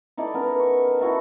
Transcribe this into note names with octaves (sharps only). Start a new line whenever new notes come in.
D#4 E4 A4 D5
B3 C#4 A#4
C#6
A5
E4 F#4 A4 E5